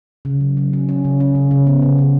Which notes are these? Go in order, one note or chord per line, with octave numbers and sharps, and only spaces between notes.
C#3
F#3
F#3
C#4
C#4
C#3
C#4
C#3
C#3
B3
C#3
C#3